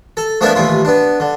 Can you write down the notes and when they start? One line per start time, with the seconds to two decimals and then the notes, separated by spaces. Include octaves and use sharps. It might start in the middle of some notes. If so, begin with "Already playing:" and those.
0.17 A4
0.41 F3 A3 B3 D4 A#4 E5
0.55 A1 D#2 E4 F4
0.85 B3 D4
1.20 D3